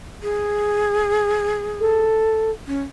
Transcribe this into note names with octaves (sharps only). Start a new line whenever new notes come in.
G#4
A4
C#4